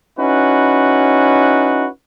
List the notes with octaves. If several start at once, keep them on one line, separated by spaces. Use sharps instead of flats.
C#4 D#4 E4 F#4 B4